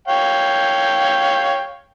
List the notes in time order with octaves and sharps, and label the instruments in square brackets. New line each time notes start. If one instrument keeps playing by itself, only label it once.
[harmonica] C#5 F5 G5